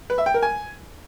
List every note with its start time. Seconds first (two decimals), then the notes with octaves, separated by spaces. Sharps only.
0.10 B4
0.18 E5
0.26 G5
0.34 A#4
0.42 G#5